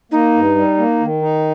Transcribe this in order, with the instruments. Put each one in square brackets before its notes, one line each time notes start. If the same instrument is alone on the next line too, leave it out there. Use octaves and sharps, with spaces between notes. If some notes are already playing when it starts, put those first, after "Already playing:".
[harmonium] A#3 [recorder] D#4
[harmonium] G2
G3
A#3
D#3
D#4